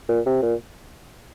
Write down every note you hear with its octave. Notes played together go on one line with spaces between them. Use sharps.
A#2
C3
A#2